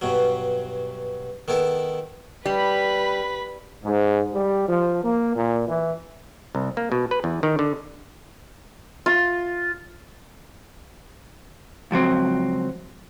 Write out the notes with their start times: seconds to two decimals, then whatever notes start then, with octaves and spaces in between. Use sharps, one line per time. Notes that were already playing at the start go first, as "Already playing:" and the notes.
0.01 G2 B2 F#3
1.48 D#3 B3 E4 A4
2.46 G3 B4 B5
3.84 G#2
4.32 G3
4.68 F3
5.04 A#3
5.35 A#2
5.68 E3
6.55 C2
6.77 A#3
6.92 B2
7.11 B4
7.24 E2
7.43 D#3
7.59 D3
9.06 F4
11.91 C#2 F3 F#3 C4